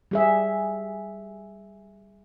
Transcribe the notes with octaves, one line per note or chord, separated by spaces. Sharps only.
G3 G#4 E5